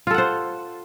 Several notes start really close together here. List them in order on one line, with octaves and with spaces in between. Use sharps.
F4 A4 F#5 C5